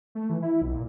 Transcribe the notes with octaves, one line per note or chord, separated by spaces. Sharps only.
A3
E3
E4
B1
A#2